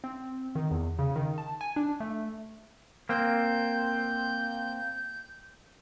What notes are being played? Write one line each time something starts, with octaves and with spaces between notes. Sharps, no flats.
C4
D#3
E2
C#3
D#3
A5
G#5
D4
A3
A#3 C4 G6